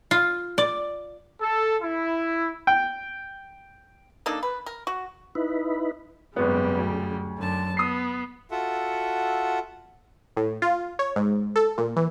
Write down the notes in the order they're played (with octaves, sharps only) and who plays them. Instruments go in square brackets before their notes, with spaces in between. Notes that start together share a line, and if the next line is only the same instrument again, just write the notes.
[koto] F4
D5
[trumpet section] A4
E4
[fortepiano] G5
[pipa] A#3 D4 D#4 A4
B4
A#4
F#4
[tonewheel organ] D#4 E4 B4
[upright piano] G#1 B3 [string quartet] F#2 C#3 G3
[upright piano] D2
[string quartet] F#2 D3 A5
[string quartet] B3 [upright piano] D#6 C7
[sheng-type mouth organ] F4 F#4 A4 E5 F#5
[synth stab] A2
F4
C#5
G#2
A4
A#2
E3